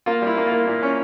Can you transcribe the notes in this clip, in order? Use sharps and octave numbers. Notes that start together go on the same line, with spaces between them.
A#3 F4
G3 E4
A#3
F4
A#3
A#2
C#4